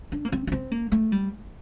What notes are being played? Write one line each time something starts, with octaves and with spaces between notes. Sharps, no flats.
D4
A#3
C4
D4
C4
A#3
A3
G3